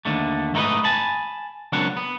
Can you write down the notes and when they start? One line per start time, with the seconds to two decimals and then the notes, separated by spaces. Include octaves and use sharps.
0.05 D#2 D3 A3
0.54 G#2 A3 D#4 A#4 B4 D#5
0.84 G#5 A5 B5
1.72 C#2 F#3 A#3 C4 D4 F#5
1.97 B3